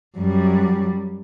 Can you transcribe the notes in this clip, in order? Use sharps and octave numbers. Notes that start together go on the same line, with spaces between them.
F#2 G3